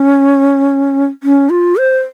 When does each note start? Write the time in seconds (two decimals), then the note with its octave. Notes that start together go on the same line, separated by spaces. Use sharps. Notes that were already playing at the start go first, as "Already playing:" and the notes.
Already playing: C#4
1.23 C#4
1.50 F4
1.77 C5